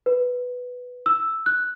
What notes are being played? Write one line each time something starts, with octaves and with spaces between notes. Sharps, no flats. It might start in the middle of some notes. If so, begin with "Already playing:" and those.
B4
E6
F#6